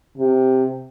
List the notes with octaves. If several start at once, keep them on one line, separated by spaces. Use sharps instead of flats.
C3